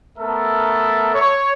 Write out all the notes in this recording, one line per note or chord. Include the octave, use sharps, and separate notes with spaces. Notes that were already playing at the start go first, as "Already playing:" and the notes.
A3 B3 A4 A#4 E5
C#5